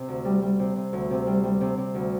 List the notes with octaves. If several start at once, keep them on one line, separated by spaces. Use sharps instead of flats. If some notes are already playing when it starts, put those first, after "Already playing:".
Already playing: C3
D2
G3
G3
C3
C3
D2
C3
G3
G3
C3
C3
D2